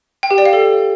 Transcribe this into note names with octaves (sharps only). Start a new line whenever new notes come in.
G5
G4
D5
F5
A4